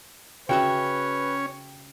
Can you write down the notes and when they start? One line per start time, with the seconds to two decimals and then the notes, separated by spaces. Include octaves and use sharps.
0.49 C#3 C#4 F#4 B4 C#5 E5 G5